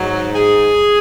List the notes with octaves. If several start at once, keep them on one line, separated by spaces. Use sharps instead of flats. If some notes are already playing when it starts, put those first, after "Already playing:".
Already playing: G#2 F#3
G#4